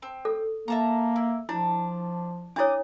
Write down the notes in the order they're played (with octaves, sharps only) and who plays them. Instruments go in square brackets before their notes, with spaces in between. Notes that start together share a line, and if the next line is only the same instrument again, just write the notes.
[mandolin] C4
[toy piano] A4
[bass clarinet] A#3 [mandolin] E5 A5 A#5
[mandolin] E4
[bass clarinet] F3 [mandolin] D4 [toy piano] E4
[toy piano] D4 E4 C#5 [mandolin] D6 D#6